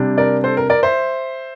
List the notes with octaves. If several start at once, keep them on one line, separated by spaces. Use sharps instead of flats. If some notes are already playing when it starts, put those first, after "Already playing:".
Already playing: C3 G3 D4
A#4 D5
A4 C5
A#4
A#4 D5
C5 E5